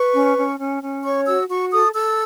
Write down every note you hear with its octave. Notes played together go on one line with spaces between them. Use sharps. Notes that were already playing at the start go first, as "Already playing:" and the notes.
Already playing: B4 C#6
C#4
C#4
C#4
C#4
C#5 C#6
F#4 E6
F#4 C#6
A4 D#6
A4 E6